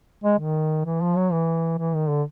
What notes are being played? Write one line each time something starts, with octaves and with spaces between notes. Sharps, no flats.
G#3
D#3
E3
F3
F#3
E3
E3
D#3
D3